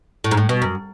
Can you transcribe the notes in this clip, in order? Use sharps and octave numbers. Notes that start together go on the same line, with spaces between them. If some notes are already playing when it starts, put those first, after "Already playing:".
A2
G#2
A2
B2
F#2